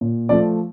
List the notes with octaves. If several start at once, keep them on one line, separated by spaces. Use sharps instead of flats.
A#2
F3 A3 D5